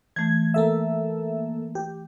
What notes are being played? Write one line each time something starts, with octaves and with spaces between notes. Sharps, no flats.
E3 A3 G#6
A#3 A4 E5
G4